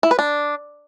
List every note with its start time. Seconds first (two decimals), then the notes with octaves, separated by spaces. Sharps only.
0.03 E4
0.11 B4
0.19 D4